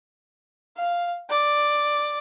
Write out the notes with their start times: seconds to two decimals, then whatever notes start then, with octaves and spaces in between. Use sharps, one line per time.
0.77 F5
1.30 D5